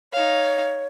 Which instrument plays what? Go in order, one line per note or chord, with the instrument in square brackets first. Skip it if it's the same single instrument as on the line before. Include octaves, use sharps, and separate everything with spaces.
[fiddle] D#4 F5 [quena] C#5